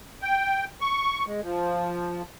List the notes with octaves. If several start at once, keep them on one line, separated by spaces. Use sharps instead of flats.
G5
C#6
G#3
F3